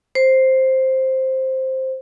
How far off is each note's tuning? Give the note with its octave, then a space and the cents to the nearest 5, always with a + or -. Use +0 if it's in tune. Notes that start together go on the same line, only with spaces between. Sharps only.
C5 +5